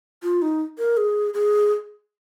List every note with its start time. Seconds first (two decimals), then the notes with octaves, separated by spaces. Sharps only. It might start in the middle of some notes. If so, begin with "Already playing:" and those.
0.23 F4
0.42 D#4
0.78 A#4
0.97 G#4
1.34 G#4